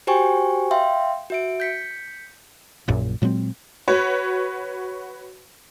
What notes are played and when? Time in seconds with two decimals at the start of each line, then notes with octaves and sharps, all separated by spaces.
0.07 F#4 G4 C5 G5 G#5 C#6
0.71 E5 F5 G5 C6
1.30 F#4 E5 D7
1.60 G6 B6 C#7
2.88 A#1 F#2 A#2
3.22 A#2 F#3 G#3 C4
3.88 F#4 B4 C#5